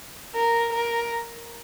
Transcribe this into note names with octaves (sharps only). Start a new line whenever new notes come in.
A#4
A#4